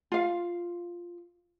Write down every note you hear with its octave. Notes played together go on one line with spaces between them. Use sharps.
F4 F5